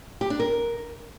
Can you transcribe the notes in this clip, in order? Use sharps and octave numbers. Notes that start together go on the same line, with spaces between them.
G4
D4
A#4